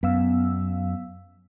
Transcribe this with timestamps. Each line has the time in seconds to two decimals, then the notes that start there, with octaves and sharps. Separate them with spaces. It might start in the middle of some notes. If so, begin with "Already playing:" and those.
0.03 F#2 B3 F5 E6